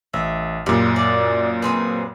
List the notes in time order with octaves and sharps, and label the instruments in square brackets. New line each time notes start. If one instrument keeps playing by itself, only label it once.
[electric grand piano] A1 [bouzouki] E5
[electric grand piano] F#2 A#2 [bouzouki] G3
[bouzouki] D5
C4 G#4 B4